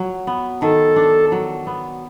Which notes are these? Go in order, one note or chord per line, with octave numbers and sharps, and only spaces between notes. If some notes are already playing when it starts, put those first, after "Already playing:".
Already playing: F#3
B3
D#3 A4
D4
F#3
B3